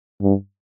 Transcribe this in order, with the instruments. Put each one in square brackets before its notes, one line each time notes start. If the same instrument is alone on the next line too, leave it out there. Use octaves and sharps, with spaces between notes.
[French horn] G2